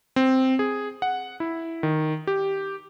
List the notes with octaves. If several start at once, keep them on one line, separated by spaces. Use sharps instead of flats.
C4
G#4
F#5
E4
D#3
G4